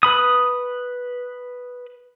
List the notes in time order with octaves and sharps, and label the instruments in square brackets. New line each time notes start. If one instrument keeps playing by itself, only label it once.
[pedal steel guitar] B4 B5 D#6